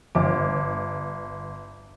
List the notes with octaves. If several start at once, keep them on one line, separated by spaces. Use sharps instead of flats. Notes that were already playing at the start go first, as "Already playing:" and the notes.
G1 D6